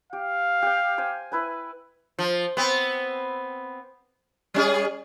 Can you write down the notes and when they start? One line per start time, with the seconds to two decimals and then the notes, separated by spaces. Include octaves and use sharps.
0.13 G4 F5
0.62 G4 G5
0.98 C5 G#5
1.32 E4 B4 G#5
2.19 F3
2.57 B3 C4
4.54 G3 C#4 G#4